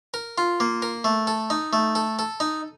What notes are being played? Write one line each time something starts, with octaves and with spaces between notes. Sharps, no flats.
A#4
F4
A#3
A#4
A3
A4
D#4
A3
A4
A4
D#4